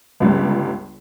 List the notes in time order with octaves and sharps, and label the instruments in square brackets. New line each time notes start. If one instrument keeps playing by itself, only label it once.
[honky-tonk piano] G1 C#2 C#3 G3